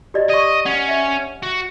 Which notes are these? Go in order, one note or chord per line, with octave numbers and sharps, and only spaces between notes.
G4 D5 D#5
D5 D#5 C#6
C#4 F#5
E5
F#4